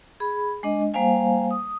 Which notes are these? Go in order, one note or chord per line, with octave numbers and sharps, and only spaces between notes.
G#4 B5
G#3 D4 D#5
G3 A#3 C5 F5 G#5
D#6